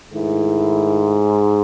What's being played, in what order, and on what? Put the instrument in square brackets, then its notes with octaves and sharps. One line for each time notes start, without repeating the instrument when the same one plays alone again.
[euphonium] G#2 [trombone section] D#3 A3 E4